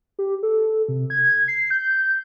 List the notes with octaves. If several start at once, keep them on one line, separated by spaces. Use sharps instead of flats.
G4
A4
C3
G#6
C7
G6